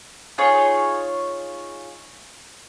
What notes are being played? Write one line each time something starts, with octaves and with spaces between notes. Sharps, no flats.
D#4 F4 G#4 C#5